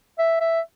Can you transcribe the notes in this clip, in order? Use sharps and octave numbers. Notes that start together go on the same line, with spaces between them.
E5
E5